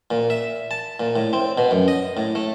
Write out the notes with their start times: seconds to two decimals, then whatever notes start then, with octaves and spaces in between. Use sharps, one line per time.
0.11 A#2
0.30 E5
0.71 A5
1.00 A#2
1.16 A2
1.33 C4
1.58 B2
1.71 F#2
1.88 D#5
2.17 A2
2.35 A3